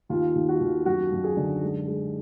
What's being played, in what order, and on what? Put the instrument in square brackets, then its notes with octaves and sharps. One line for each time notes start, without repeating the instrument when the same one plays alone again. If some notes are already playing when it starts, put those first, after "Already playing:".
[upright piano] D#2 F4
D#2
F#4
D#2
F#2 F#4
F#2
G#4
D3
G#3
G#3